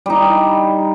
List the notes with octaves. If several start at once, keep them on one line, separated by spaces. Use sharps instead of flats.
G3 D#4